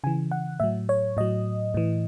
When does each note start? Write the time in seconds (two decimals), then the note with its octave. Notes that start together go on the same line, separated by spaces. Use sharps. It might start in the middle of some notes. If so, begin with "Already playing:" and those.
0.04 C#3 E3 G#5
0.31 F#5
0.60 A2 F#3 E5
0.89 C#5
1.17 A2 F#3 D#5
1.74 A2 E3